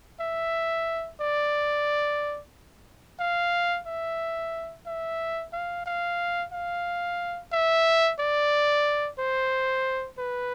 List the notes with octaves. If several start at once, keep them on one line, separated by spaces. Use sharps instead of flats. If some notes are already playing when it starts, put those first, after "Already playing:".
E5
D5
F5
E5
E5
F5
F5
F5
E5
D5
C5
B4